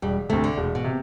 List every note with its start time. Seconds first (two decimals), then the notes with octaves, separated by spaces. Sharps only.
0.02 E1 G3
0.29 D2 C3 A3
0.44 D3
0.57 E1
0.75 B2
0.84 C3